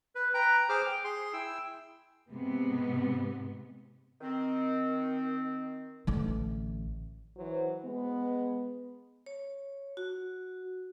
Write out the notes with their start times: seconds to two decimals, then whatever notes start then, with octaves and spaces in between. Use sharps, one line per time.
0.15 B4
0.34 B4 G5 A#5
0.69 G#4 C5 D6 F6
0.87 G5
1.04 G#4 C6
1.33 E4 G5 E6
2.30 G#2 C3 G#3 B3
4.21 D#3 C4
6.07 A1 D3
7.36 E3 F#3 C5
7.83 G#3 B3
9.26 C#5
9.97 F#4